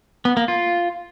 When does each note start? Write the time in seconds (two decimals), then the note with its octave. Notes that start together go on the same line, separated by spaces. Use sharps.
0.25 B3
0.37 A#3
0.48 F4